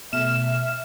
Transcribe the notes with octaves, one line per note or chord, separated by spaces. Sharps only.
B2 A3 E5 F6 E7